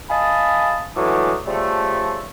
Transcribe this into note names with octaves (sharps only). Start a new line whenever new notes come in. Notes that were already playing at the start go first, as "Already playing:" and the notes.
D#5 F5 G#5 A5 B5 D#6
D3 E3 F#3 G#3 A3 D6
C#3 F3 G3 A3